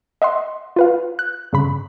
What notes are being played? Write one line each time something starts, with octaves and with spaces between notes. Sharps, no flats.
D#5 E5 F#5 C6
F4 B4 F5
F#6
G2 C#3 B5